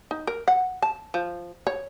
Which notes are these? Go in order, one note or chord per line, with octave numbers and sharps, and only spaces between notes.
D#4
A#4
F#5
A5
F3
C#5